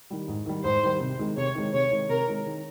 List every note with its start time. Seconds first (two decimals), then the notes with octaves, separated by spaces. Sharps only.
0.10 D#3 G3
0.28 G#2
0.46 D#3 G3
0.64 G#2 C5
0.83 D#3 G3
1.01 C3
1.19 D#3 G#3
1.37 C3 C#5
1.55 D#3 G#3
1.73 C3 C#5
1.91 D#3 G#3
2.09 C3 A#4
2.27 D#3 G#3
2.46 D#3